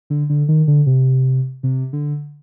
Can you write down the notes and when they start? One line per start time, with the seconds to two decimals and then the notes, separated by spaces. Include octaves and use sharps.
0.10 D3
0.30 D3
0.48 D#3
0.68 D3
0.87 C3
1.63 C3
1.93 D3